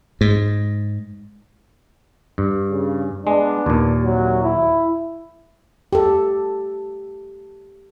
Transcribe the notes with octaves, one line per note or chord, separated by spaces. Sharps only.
G#2
G2
C#3
G#3 B3 D4
D#2 A#2
C3 F#3
E4
G4 A4